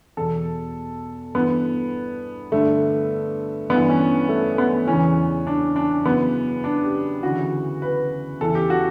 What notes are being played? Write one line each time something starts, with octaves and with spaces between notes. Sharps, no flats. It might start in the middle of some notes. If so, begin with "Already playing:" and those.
E2 B2 A4
G2 E3 B3
G2 D3 A3
G2 E3 B3
C#4
A3
B3
E2 C#3 E3 C#4
D4
D4
F#2 C#3 E3 B3
D4
G4
D2 C#3 E3 F#4
B4
E2 C#3 E3 A4
G4
F#4